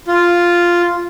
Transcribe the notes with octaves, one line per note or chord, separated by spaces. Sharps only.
F4